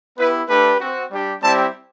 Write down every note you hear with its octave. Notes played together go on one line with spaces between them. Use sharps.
B3 E4 G4 B4
A3 D4 G4 B4
C4 F#4
G3 D4 G4
G3 C4 E4 G4 A5